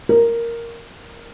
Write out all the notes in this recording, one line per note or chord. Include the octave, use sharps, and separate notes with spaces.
A#4